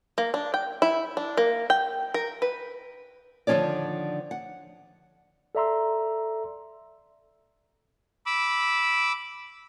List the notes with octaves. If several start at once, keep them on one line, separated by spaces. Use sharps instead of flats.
A#3
D4
G5
E4
D4
A#3
G5
A#4
B4
D3 D#3 F3 C#4 C#5 D5
F#5
A4 D5 E5 A#5 C6 E6
B5 D6 E6